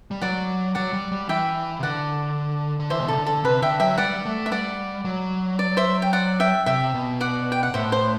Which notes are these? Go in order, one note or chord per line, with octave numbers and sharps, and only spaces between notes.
G3
F#3 D5 F#5
F#3 D5 F#5
G3
G3
E3 E5 G5
C3
D3 D5 F#5
D3
E3 C5 E5
B2
C3 A4
D3
A4
C3 B4
D3 E5 G5
F#3 E5 G5
G3 D5 F#5
A3
E5
G3 D5 F#5
F#3
D5
C5 E5
G5
D5 F#5
E5 G5
C3 E5 G5
B2
D5 F#5
G5
F#5
A2 C5 E5
C5